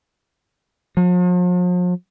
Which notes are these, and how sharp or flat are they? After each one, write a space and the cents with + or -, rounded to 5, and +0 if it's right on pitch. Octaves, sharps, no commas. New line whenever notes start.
F3 +45